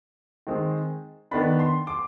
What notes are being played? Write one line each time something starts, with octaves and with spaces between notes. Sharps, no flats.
D#3 G#3 C4
D#3 B3 D4 B5
C6
D6